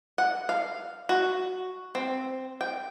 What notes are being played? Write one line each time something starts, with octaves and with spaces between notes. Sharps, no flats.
F#5
F5
F#4
C4
G5